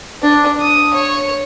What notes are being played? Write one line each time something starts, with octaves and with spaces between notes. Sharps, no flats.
D4
D#6
C#5